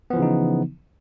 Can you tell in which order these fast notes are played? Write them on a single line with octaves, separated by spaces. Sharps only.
B3 F3 E3 C#3 D#4